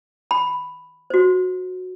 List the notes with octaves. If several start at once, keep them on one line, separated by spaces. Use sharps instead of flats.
B5
F#4 C5